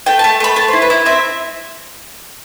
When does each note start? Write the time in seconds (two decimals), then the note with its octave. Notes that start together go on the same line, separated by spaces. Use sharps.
0.06 A3 G5
0.19 A5
0.24 A3
0.40 A3 B5
0.56 A3 A5
0.68 C5
0.73 E4
0.82 B4
0.90 E4
1.05 C4 E5